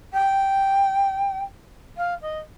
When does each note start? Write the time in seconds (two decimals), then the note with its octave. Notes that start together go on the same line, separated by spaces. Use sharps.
0.13 G5
1.97 F5
2.22 D#5